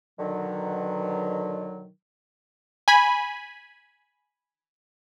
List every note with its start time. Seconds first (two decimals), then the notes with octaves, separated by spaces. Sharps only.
0.19 B2 D3 D#3 F#3
2.88 G#5 B5